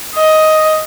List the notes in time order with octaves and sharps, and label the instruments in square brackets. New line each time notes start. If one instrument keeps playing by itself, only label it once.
[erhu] D#5